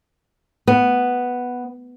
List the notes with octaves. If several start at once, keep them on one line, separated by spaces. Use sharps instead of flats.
B3